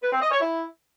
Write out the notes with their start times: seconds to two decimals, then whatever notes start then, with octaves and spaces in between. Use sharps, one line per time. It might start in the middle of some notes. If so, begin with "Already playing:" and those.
0.02 B4
0.11 C4
0.21 D#5
0.31 C#5
0.40 E4